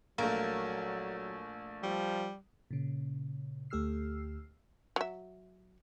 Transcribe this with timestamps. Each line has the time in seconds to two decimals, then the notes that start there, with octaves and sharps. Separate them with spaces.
0.18 A#1 F#3 A3 A#3
1.83 F3 G3
2.71 A#2 C#3
3.70 D2 A3 G4 E6 F6 C7
4.96 F#3 E5